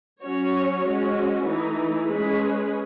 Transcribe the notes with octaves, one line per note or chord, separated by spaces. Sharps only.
F#3 C#4 F#4 C#5
G#3 C#4 F#4
E3 A3 D#4
G#3 C#4 G#4 B4